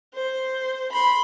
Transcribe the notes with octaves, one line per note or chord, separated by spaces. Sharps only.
C5
B5 C6